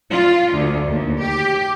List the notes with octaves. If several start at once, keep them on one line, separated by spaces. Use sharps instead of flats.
F4
D2
D#2
G4